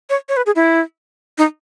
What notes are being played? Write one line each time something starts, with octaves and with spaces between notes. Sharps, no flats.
C#5
C#5
B4
G#4
E4
D#4